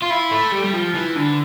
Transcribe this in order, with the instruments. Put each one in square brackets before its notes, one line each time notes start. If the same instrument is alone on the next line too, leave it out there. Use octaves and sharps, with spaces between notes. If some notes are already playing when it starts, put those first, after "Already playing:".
[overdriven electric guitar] F4
E4
A3
G3
G3
F3
E3
D3